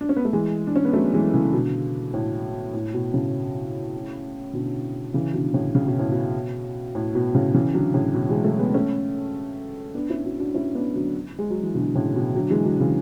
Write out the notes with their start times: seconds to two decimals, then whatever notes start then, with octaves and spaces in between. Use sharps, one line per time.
0.01 D4
0.09 C#4
0.16 B3
0.25 A3
0.33 E3 G#3
0.67 D4
0.76 C#4
0.85 B3
0.93 F#3 A3
1.14 E3 G#3
1.33 C#3 E3
1.53 B2 D3
2.14 A2
2.74 A2
2.94 B2
3.14 A2 C#3
4.53 B2 D3
5.14 C#3 E3
5.34 B2 D3
5.54 A2 C#3
5.75 C#3
5.87 B2
5.99 A2
6.12 B2
6.95 A2
7.15 B2
7.34 A2 C#3
7.54 C#3 E3
7.74 D3 F#3
7.94 A2 C#3
8.14 B2
8.29 E3 G#3
8.44 F#3 A3
8.59 G#3 B3
8.74 A3 C#4
9.95 B3 D4
10.10 C#4 E4
10.25 D4 F#4
10.39 D4 F#4
10.54 C#4 E4
10.75 B3 D4
10.95 D3 F#3
11.39 G#3
11.50 F#3
11.63 E3
11.75 B2 D3
11.95 A2 C#3
12.15 B2
12.35 D3 F#3
12.50 E3 G#3
12.65 D3 F#3
12.80 C#3 E3